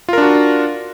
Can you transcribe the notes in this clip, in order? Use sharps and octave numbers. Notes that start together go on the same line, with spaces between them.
D4 F4 F#4 A#4